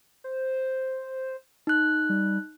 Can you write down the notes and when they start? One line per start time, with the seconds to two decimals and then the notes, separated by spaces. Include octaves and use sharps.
0.24 C5
1.67 D#4 F#6
2.09 G3